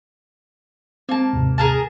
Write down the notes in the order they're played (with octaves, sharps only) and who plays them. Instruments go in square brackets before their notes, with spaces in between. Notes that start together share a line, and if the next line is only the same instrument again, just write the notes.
[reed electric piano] G#3 C4 [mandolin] A#3 A5
[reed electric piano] D#2 G#2 C3
[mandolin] G#4 A#4 A5